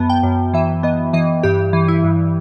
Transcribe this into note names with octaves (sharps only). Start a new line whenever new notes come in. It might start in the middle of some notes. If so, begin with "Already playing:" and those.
Already playing: F#2 B3 A5
G5
F#2
E3 E5
B3 D#5
E3 D#5
G2 G4
E3
E4
G2